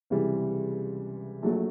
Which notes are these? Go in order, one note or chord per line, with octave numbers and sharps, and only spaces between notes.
C#2 C3 E3 G3
A#1 A#2 F#3 A3